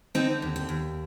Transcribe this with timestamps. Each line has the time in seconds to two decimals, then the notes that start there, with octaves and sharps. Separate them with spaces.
0.14 D3 C4 D#4
0.42 D#2
0.56 C4
0.69 D#2